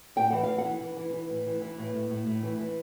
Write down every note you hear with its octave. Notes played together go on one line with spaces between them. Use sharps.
A2 G5
E3 F#5
E3 F5
F#5
E3
E3
E3
E3
A2
E3
E3
A2
A2
A2
A2
E3
E3